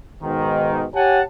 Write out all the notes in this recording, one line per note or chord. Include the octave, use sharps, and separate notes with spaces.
G#2 B2 D#3
G4 C#5 F#5 G#5 A5